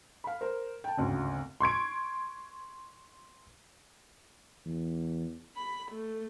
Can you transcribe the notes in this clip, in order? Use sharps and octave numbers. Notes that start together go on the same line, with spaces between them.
F5 B5
A#4 C5
G5 A5
G#1 D2 C#3
C6 C#6 G#6 D7
E2 E3
B5
A3